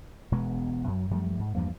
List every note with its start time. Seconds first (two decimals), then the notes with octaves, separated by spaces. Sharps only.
0.32 E1 B2 G#3 B3
0.87 F#2 F#3
1.11 F#2 F3 G3 A3
1.39 G#2
1.55 E2 G2 F3 A#3